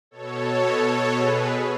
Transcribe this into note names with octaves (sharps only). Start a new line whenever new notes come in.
B2 A4 C#5
A4 C#5
G#4 B4